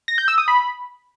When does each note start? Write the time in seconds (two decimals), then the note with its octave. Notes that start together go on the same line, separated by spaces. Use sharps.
0.08 A#6
0.18 G6
0.28 E6
0.38 D#6
0.48 B5